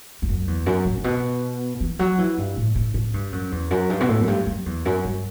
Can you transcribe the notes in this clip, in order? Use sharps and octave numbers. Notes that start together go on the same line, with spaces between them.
E2
F#2
E2
F#2
A2
A2
B2
E3
F#3
E3
G2
A2
A2
A2
G2
F#2
E2
F#2
G2
B2
A2
F#2
G2
F#2
E2
F#2
G2